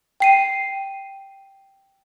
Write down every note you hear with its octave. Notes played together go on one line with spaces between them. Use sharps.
G5 C7 D#7